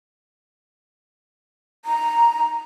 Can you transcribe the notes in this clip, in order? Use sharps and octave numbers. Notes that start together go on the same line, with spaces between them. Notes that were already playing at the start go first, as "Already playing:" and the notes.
A#5